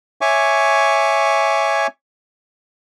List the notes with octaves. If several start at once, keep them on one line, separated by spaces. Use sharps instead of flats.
C#5 E5 G#5 C#6 D6